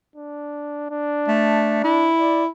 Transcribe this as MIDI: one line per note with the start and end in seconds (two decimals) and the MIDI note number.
0.16 0.90 62
0.91 2.12 62
1.28 1.80 57
1.84 2.47 64
2.19 2.44 74